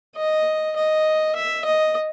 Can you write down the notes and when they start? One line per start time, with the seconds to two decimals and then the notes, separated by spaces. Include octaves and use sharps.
0.17 D#5
0.76 D#5
1.35 E5
1.65 D#5